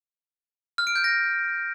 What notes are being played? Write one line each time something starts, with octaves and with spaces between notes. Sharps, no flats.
F6
D7
G6
A#6